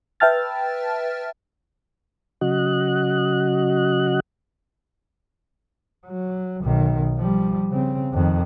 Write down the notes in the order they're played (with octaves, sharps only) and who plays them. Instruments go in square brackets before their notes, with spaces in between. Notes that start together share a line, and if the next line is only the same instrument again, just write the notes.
[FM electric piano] B4 E5 G5 A5 F6 A6
[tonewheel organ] C#3 F#3 F#4 D#5 F#6
[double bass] F#3
B1 D#3
F3 G3
C#3 C4
F2 D#3